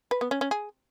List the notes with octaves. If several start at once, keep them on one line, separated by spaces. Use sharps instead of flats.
B4
B3
C#4
C#4
G#4